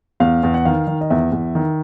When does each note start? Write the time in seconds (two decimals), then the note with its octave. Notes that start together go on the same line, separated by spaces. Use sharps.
0.20 E2 F5
0.43 E2
0.54 F#5
0.65 D#3 F5
0.87 D#3
1.01 D#5
1.10 E2 E5
1.32 E2
1.55 D#3